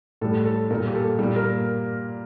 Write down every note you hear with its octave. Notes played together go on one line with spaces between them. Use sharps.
A2 G3 A4
A4
A#2 G3 A#4
G4
A4
A#2 G3
A#4